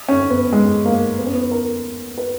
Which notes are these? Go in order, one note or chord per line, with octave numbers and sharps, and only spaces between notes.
C#4
B3
G#3
A#3
B3
C#4
B3
A#4
B4